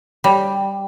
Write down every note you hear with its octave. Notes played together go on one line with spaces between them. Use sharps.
G3